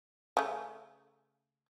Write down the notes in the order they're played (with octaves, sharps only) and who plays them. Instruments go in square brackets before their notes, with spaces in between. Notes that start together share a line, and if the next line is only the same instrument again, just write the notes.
[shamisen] C#3 A3